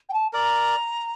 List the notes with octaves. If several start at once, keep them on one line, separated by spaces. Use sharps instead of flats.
G5
A5
A#4 D5 A#5